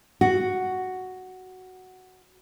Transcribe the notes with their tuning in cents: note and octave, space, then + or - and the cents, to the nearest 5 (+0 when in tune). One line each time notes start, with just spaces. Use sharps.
F#4 +5